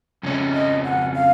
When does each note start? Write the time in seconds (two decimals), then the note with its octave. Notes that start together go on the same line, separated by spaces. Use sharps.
0.23 F2 C#3 G#3 C#4
0.54 D#5
0.84 F#5
1.14 F5